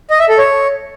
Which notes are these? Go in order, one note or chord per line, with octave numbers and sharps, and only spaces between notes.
D#5
E5
A4
C#5